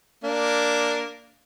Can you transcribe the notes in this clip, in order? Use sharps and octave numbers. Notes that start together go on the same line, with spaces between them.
A#3 D4